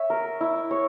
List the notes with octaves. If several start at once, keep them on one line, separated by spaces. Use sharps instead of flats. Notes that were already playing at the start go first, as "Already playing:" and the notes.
Already playing: C#5 E5
A#4
E4
C#5